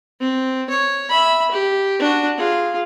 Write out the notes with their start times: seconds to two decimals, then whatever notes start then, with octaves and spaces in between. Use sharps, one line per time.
0.20 C4
0.69 C#5
1.10 E5 B5
1.51 G4
2.00 D4 F#4
2.38 F4 G#4